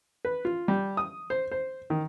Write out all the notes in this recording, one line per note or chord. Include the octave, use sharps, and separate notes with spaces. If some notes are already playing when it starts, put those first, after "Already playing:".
B4
F4
G3
D#6
C5
C5
D#3